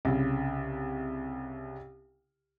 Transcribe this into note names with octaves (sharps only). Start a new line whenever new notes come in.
C2 C#3